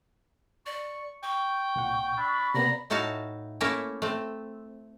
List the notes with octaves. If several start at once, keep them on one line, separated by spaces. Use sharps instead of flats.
D5 C#6
G5 C#6
C2 A#2 F#5
D4 B5 E6
C3 A#3 B3 D5 A#5
A2 D#4 E4 F#4 F5 A5
A3 A#3 C#4 E4 A#4 E5
A3 C4